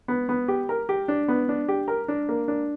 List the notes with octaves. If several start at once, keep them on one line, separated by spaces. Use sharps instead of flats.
B3
B3
G4
A#4
G4
D4
B3
D4
G4
A#4
D4
A#3
D4